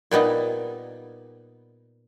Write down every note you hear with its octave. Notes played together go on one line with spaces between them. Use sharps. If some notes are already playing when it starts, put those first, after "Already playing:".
A#2 G3 B3 D#4